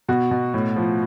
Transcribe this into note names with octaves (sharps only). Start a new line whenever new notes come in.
B2 F#4
B2
A2
F3